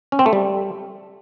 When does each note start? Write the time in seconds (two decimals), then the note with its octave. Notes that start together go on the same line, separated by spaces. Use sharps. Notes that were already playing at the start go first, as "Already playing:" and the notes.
0.12 C#4
0.19 C4
0.26 A3
0.33 G3